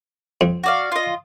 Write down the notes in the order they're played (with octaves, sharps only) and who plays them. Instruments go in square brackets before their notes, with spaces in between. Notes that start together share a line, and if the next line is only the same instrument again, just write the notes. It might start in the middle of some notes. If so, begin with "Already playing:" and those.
[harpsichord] F2
[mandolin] F#4 D5 F5
F4 D#5